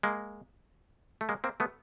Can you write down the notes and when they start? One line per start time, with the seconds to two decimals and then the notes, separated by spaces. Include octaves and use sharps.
0.03 G#3 A#3
1.21 A3
1.29 G#3 A#3
1.44 A#3 C4
1.60 A3 B3